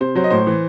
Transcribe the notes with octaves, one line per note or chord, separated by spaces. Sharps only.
C3 C5
F#3 C5
D#5
A2 C5
E3